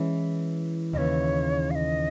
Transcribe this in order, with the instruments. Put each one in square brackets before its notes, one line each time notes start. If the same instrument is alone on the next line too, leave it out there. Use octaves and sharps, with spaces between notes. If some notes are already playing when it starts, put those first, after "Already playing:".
Already playing: [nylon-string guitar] E3 G#3 C#4 E4
[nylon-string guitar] D#2 C#3 E3 [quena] C#5 D#5
[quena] F5
D#5